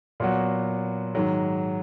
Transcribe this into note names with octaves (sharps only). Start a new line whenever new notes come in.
A#2 F#3 B3 F#4
G#2 D#3 F#3